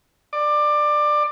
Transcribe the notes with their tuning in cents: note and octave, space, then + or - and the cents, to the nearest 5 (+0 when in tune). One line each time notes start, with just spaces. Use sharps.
D5 +20